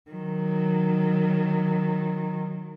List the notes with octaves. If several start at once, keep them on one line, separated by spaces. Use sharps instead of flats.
D#3 F#3